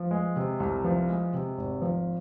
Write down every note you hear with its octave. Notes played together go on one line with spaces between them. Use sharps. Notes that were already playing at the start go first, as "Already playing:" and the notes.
Already playing: F3
G#3
C3
C2
F3
G#3
C3
G#1
F3